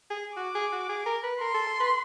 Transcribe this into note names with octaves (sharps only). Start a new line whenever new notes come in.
G#4
F#4 D6
G#4
F#4
G#4
A#4
B4
A#4 C6
A4
A4
B4